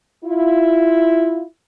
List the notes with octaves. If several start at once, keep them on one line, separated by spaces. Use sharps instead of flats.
E4 F4